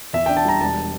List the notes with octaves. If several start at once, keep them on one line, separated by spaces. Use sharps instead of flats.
E2 E5
D4 G5
A5
G3 A#5
E1 A5